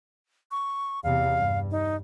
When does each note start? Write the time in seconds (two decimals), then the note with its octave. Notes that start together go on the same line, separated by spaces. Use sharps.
0.51 C#6
1.04 E2 C3 F5
1.37 G2
1.71 D#4